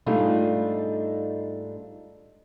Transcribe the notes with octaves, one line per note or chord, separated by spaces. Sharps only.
G#2 G3 A3 D4 D#4 F4